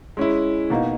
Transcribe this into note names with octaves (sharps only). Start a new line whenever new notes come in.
G#3 C#4 E4
B2 A#3 D#4